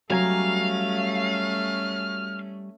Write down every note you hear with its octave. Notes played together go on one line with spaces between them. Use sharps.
F#3 G3 A3 C#4 F5 G#5 A#5